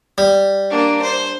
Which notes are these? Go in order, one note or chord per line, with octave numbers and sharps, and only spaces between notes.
G3
A#3 D4
C5